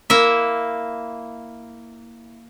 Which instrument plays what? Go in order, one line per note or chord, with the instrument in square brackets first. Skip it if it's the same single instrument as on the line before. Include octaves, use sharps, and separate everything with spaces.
[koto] A#3 E4 E5